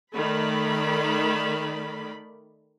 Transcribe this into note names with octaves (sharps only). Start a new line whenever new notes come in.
D#3 A3 D5 B5